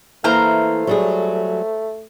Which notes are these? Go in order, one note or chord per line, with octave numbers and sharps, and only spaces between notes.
E3 A3 A#3 E4 C5 A#5 F6
F#3 G3 G#4